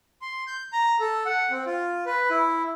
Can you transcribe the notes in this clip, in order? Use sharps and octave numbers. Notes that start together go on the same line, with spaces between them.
C6
G6
A#5
A4
F#5
C4
F4
B4
E4